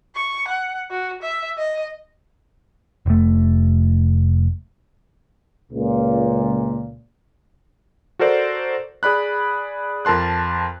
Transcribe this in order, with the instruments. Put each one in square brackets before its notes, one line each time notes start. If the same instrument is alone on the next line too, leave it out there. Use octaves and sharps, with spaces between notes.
[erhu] C#6
F#5
F#4
E5
D#5
[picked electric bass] F1 A3
[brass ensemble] C#2 A#2
[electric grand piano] F#4 A4 A#4 C5 D5
G#4 D5 B5 F#6
F2 A#4 A5 C6 F#6